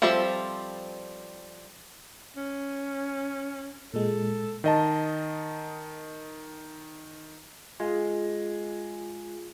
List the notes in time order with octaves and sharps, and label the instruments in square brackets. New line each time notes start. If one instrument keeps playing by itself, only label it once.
[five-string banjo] F3 G3 C4 A4 E5
[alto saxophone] C#4
[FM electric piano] A#2 G#3 [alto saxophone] A4
[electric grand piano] D#3 D#5 A5
[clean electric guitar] G#3 [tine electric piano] F4 G#4